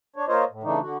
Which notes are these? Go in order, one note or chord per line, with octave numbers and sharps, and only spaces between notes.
D4 C#5
A#3 F4 C5 C#5 D#5
A2
C#3 E3 A3 D4 D#4
D3 F#4